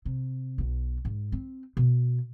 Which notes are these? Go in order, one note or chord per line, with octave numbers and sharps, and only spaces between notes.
C3
B1 B2
G#2
C4
B2